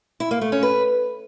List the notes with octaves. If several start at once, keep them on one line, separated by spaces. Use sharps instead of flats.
E4
A#3
A3
C#4
B4